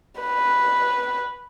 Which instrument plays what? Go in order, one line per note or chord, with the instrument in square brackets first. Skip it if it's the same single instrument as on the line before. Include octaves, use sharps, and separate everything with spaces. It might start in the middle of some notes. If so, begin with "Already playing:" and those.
[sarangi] B4